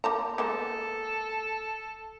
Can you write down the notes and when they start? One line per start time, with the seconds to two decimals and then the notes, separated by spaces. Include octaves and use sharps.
0.04 A#3 A5 A#5
0.38 G#3 A#3 B3 A4